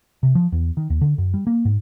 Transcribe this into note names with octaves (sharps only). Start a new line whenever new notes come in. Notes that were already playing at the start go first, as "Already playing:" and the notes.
C3
F3
E2
D#3
D#2
D3
F#2
G3
A#3
G#2